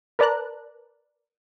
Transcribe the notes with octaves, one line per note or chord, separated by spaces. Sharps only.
A#4 B4 D5 A5 A#5 F#6